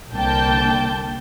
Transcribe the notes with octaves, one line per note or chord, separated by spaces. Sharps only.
C2 D3 A#3 G5 A5 G6